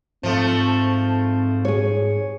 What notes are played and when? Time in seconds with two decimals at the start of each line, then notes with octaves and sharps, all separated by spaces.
0.23 G#2 F3 A3 C4
1.65 G#4 C#5